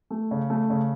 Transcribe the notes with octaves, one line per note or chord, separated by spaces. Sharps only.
A3
C#3
A3
C#3